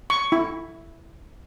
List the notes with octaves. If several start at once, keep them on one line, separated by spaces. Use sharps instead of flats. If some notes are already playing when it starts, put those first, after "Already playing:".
C#6
E4